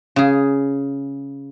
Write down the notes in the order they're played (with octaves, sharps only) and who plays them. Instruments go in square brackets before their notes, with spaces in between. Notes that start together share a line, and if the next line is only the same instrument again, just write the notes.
[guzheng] C#3 G#4